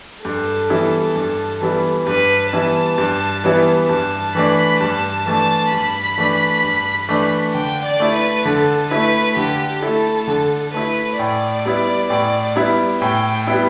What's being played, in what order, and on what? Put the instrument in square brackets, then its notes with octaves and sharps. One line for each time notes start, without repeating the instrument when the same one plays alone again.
[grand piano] G2 [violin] A4
[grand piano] E3 G3 B3 E4
G2
E3 G3 B3 E4
[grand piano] G2 [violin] B4
[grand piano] E3 G3 B3 E4 [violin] A5
[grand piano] G2
E3 G3 B3 E4
[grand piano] G2 [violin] A5
[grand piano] E3 A3 D4 [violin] B5
[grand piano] G2 [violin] A5
[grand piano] E3 A3 D4 [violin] A5
[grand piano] G2 [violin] B5
[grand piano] E3 A3 D4
G2
E3 A3 D4
[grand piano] D3 [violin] G5
[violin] D5
[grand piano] A3 E4
[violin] B4
[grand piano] D3 [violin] A4
[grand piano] A3 E4 [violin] B4
[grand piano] D3 [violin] G4
[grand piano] A3 E4 [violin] A4
[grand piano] D3 [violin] A4
[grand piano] A3 E4 [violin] B4
[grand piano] A2 [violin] D5
[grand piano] G3 B3 E4
A2
G3 B3 E4
[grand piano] A2 [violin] G5
[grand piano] G3 B3 E4